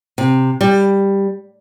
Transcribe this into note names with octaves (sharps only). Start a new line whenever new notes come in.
C3
G3